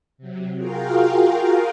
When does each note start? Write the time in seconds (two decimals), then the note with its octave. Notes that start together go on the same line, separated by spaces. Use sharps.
0.18 C3 F#3
0.56 F4 F#4 G#4 A#4 F5 G5